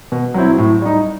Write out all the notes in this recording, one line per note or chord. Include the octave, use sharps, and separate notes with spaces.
B2
F#3 C4 E4
A2
G3 D#4